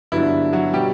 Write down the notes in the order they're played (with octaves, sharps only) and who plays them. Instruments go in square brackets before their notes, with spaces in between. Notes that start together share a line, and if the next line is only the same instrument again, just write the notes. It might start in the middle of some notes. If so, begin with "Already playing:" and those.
[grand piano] G2 D3 F#3 B3 D4 E4
F#3 F#4
B2 F#3 G3 B3 G4